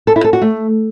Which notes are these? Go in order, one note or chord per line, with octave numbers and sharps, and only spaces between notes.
A4
E4
A4
F#4
A3